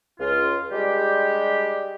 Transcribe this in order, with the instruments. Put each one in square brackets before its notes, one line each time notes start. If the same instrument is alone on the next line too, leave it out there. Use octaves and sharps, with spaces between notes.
[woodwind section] C#2 F4
G3 G#3 D4 G4